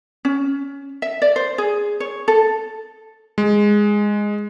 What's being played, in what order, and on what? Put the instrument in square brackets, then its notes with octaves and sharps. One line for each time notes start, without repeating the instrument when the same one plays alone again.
[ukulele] C#4
E5
D5
C5
G#4
C#5
A4
[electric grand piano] G#3